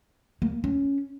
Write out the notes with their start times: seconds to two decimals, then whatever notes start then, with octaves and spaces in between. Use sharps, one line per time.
0.42 A#3
0.64 C#4